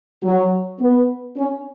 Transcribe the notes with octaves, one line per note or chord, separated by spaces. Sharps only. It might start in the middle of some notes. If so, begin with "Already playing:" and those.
F#3
B3
C#4